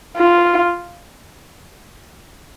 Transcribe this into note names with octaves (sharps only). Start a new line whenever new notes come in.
F4